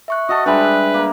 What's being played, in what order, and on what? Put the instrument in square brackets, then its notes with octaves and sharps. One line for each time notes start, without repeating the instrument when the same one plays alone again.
[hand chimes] E5 C#6 F#6
[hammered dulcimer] F#4 A4 [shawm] D#5
[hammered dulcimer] G3 G#3 [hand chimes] D4 E5 F#6 [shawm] B4
[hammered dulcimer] A#3